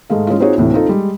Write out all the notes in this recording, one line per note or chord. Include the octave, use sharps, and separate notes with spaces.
G#2 G#3 A3 F5
G#3 C#4 E4 F4
C4 D#4 F4 F#4 G#4 C#5
D2 A2 C3 E3
C4 D#4 F4 A4
G3 G#3